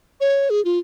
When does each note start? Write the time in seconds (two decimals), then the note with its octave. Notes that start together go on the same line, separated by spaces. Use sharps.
0.20 C#5
0.50 G#4
0.65 F4